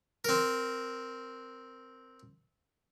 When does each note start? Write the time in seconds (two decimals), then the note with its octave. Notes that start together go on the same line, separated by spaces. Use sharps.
0.25 C4 A#4